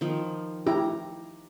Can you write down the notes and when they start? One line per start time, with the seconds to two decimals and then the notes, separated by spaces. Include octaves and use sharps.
0.01 D#3 F3
0.67 E4 G4 A#5